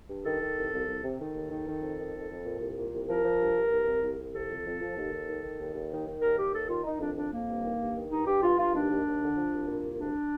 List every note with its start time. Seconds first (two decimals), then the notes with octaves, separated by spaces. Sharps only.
0.09 G2
0.24 D#3 A4
0.40 D#3
0.56 C2
0.71 C2
0.87 C2
1.02 C3
1.18 D#3 A4
1.34 D#2
1.50 D#3
1.66 D#3
1.81 F2
1.98 D#3
2.13 F2
2.28 F2
2.44 A#2
2.59 C2
2.76 A#2
2.91 C2
3.07 F3 A#4
3.22 F3
3.39 G2
3.55 G2
3.70 C2
3.86 C2
4.01 C2
4.17 C2
4.33 C3 A4
4.48 F2
4.65 F2
4.80 F3
4.96 D#2
5.11 D#2
5.27 D#3
5.43 D#3
5.58 D#2
5.74 D#2
5.90 D#3
6.05 D#3
6.21 D#2 A#4
6.36 D#3 G4
6.53 D#2 A4
6.68 D#3 F4
6.84 D#3 D#4
7.00 F2 D4
7.16 F2 D4
7.32 F2 A#3
7.47 G2
7.63 D#3
7.79 G2
7.94 D#3
8.09 G2 D#4
8.25 G2 G4
8.41 G2 F4
8.57 G2 F4
8.72 D#2 D4
8.88 D#2
9.04 D#2
9.20 D3
9.36 F3
9.51 C2
9.67 A#2
9.82 C2
9.98 D2 D4